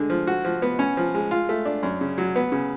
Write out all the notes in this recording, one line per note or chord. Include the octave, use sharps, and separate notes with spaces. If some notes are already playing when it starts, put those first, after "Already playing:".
Already playing: D3 G#3
F3
F#4
F3
B3
C#4
F3
G#3
F4
A3
D4
F#2
C#3
F#3
B3
C#3